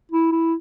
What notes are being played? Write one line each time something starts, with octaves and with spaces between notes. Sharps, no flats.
E4
E4